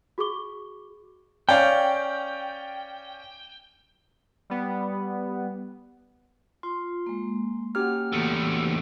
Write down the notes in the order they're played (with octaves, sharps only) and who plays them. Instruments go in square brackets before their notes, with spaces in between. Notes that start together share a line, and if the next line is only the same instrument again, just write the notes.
[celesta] F#4 G#4 C#6 D6 G7
[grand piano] C#4 D5 F5 [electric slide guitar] G5
[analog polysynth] G3 B3
[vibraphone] F4 [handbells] C6
[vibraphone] G#3 A#3
[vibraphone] A#3 F#4 F#5 [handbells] C#4 G4 F6
[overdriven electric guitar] E2 A3